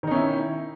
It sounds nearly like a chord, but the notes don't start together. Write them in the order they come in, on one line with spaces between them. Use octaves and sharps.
D#3 D#4 C#4 E4